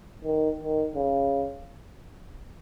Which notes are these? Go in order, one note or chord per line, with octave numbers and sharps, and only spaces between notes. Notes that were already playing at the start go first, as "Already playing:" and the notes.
D#3
D#3
C#3